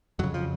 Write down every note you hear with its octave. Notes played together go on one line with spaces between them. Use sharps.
F2 C#3 F#3
F3